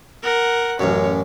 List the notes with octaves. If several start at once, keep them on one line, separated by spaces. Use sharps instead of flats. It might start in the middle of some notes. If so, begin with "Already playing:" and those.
A#4 F#5
A1 F#2 C#5